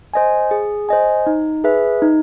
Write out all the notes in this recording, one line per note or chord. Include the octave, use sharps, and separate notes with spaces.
C5 D#5 G#5
G#4
C5 D#5 G#5
D#4
G#4 B4 E5
D#4